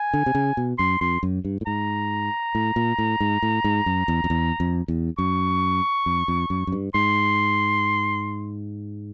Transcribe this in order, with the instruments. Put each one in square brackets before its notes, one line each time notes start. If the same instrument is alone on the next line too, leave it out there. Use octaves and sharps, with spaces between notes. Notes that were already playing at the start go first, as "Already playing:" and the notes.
Already playing: [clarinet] G#5
[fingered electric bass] D3
C3
C#3
B2
[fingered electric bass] F#2 [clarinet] C6
[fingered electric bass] F2 [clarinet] C6
[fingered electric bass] F#2
G2
A2
[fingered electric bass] G#2 [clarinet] A#5
[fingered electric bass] A2
A#2
A2
G#2
A2
G#2
F#2
E2
F2
E2
F2
E2
[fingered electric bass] F#2 [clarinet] C#6
[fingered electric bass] F2
F2
F#2
F#2
G2
[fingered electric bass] G#2 [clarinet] C6